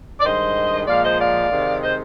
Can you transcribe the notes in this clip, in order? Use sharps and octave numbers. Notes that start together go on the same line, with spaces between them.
D5
G2 D#3 G#3 C5 D#5
A#2 F3 G#3 D5 F5
C5 D#5
D5 F5
C3 D#3 G#3
C5 D#5